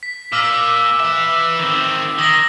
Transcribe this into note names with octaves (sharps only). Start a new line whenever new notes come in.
B6
A#2 D6 E6 F6
B4 E5
D#3 C4
D#3 D#6 A#6 F#7